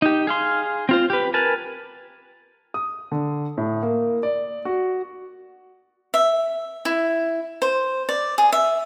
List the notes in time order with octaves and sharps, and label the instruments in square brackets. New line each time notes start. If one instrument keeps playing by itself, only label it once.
[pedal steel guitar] D#4 G4
G#4 F5 C6
C4 F4 C5
G4 B4
A#4 B4 G#5 A5
[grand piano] D#6
D3
A2
A#3
D5
F#4
[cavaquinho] E5
E4
C5
D5
G#4
E5